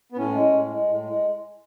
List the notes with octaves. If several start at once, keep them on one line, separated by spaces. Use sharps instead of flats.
B3
A2 C#4
G#3
A2
G#3
A2
G#3